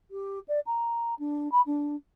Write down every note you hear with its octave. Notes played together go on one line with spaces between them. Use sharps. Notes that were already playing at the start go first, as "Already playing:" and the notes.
G4
D5
A#5
D4
B5
D4